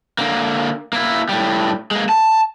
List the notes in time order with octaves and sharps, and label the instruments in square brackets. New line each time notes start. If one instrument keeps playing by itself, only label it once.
[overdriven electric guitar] D3 A#3
A#3 E4
A2 G3
G#3 A#3
A5